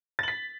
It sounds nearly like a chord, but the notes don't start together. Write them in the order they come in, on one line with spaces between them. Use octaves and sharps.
A6 F#7 B6